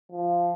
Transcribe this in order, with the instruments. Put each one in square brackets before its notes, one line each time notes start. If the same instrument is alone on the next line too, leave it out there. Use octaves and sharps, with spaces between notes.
[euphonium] F3